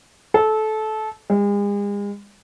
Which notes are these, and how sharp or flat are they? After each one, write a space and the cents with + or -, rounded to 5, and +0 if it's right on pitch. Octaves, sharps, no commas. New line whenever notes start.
A4 -20
G#3 -40